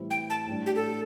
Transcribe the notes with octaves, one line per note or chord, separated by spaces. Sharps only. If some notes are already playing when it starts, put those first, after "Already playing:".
Already playing: A2 E3 G3 C4 E4
G5
A5
A2 G3 D4
G4
A4